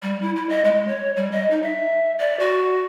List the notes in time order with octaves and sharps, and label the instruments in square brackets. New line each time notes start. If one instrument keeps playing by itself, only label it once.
[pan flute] G3
E4
E4
D#5
G#3
C#5
G3
D#5
D#4
E5
D5
F#4